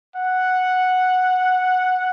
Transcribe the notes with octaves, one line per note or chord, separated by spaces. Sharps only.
F#5